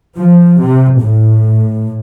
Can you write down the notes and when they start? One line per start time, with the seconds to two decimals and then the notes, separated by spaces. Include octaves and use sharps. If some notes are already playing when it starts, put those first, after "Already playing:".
0.18 F3
0.60 C3
1.00 A2